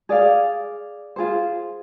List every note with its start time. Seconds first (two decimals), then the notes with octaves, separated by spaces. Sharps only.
0.09 G#4 D5 F5
1.16 F4 G#4 C5